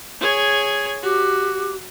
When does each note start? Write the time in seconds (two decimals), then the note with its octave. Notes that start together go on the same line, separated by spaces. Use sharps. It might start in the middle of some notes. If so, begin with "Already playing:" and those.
0.21 G#4 C#5
1.03 F#4 G4